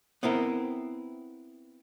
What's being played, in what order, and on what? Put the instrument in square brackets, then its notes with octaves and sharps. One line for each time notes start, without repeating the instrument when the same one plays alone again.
[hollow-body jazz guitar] B3 C4 E4 A#4